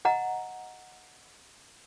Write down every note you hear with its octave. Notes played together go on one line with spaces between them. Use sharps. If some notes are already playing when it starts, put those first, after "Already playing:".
D#5 F#5 A#5